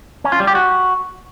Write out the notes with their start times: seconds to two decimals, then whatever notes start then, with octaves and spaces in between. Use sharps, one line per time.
0.24 C#4
0.32 F4
0.40 G3
0.47 G4
0.55 F#4